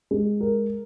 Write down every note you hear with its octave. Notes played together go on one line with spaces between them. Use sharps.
G#3
A#4